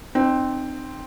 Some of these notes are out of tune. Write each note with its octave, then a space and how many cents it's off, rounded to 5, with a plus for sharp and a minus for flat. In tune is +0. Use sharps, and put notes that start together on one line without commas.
C4 +0 D#4 -35